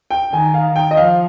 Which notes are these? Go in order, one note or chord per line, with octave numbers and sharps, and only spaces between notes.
G5
D#3 G#5
F5
G5
D#5
F3 F5